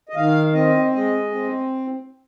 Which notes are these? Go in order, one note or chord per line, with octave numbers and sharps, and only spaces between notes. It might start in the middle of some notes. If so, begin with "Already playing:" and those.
D#5
D#3 F5
C4 D#5
G#3 D#5
C4